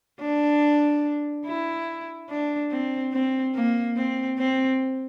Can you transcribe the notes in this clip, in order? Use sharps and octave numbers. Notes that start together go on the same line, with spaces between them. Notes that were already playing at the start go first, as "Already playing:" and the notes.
D4
E4
D4
C4
C4
A#3
C4
C4